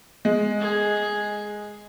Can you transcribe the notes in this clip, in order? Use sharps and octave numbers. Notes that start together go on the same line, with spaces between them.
G#3
G#4